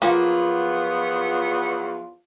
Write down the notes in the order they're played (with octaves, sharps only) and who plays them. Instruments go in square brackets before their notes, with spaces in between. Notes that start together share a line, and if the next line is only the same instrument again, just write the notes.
[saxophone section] E2 F#3 B3 [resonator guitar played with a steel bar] F3 [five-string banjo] A#3 [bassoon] F4